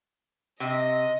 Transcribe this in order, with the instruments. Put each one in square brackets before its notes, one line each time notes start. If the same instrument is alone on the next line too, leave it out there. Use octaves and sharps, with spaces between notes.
[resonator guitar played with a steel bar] C3 [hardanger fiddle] D#5